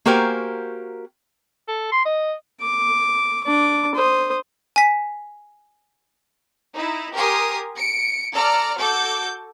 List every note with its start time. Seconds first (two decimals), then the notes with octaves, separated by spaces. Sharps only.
0.05 A#3 F#4 G4 A#4 C5 G#5
1.68 A4
1.92 C6
2.05 D#5
2.61 D6
3.44 D4 D6
3.95 C5 D#6
4.76 G#5 B6
6.73 D#4 E4
7.13 G4 A#4 G#5 C6 D#6
7.76 C#7 D7
8.33 A4 D5 A#5 F6
8.77 F#4 A4 D6 G6